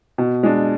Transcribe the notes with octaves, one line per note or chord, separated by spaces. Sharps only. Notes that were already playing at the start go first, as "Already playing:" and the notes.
B2
G#3 D4